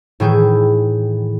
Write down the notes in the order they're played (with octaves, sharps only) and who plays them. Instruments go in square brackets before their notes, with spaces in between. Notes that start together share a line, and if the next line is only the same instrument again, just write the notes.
[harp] A2 D#3 E3 E4 G#4 G6